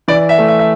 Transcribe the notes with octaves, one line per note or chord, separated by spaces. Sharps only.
E3 D5
E5
A3
E5
E5